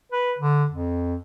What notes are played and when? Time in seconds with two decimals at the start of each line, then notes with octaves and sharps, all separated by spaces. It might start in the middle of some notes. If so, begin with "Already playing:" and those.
0.12 B4
0.39 D3
0.71 F2